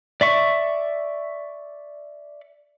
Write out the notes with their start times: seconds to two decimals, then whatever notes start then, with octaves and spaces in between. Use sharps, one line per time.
0.21 D5 E5 C#6